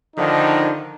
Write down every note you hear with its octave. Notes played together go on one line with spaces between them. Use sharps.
D3 D#3 F3 D#4